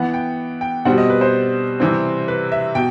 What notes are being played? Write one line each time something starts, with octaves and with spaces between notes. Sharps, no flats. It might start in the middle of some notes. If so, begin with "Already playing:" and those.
Already playing: E3 B3 F#5
G5
G5
B2 G3 C4 F#5
D#5
B4
C5
C3 E3 G3 C4
B4
E5
B2 G5